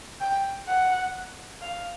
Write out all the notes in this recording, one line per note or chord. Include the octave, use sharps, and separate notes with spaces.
G5
F#5
F5